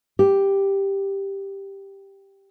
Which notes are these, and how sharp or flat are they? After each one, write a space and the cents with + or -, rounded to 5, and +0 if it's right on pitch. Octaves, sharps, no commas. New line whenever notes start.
G4 +5